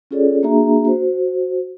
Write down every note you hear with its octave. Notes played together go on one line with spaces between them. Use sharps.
C#4 F4 G#4 A4 C#5 D5
A#3 D4 F#4 G#4 E5 A#5
F#4 C5